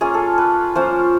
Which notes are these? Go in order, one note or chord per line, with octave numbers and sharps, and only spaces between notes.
A#3 C#4 F4 G#4
A4
B4
F3 A#3 C#4 F4 C5